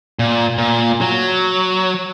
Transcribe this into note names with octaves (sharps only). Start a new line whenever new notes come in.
A#2
A#2
F#3